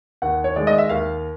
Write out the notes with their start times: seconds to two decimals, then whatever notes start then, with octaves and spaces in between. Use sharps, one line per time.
0.22 D#2 F#5
0.44 C#5
0.56 D#3 G#3 D5
0.67 D#5
0.78 E5
0.89 D#2 F5